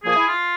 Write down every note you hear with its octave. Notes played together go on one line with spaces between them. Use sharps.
A#2 F3 A#3 G#4
E4
F4